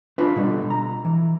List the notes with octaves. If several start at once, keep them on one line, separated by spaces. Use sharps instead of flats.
C#4 D4 F4 B4
B2 D3 G3
A#5
E3